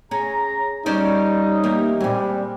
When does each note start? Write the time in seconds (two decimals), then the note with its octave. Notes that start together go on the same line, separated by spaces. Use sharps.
0.11 C#4 G#4 A#5
0.86 G3 C#4 D#4 C5 D5
1.63 E3 A#3 G4
2.00 A#2 G3 G#3 C4